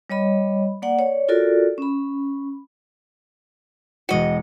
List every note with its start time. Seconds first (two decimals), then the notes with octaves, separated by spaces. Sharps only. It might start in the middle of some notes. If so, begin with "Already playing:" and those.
0.10 G3 C#5 D#5 B5
0.82 A#3 D5 F#5
0.99 C#5 D5
1.29 F4 F#4 A4 A#4 D5
1.78 C#4 B5
4.09 E1 G#3 F#4 D#5 C#7